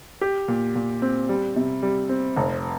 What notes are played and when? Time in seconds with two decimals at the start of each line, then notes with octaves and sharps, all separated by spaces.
0.21 G4
0.48 A#2
0.75 A#2
1.02 C4
1.29 G3
1.56 C3
1.83 G3
2.09 C4
2.36 F1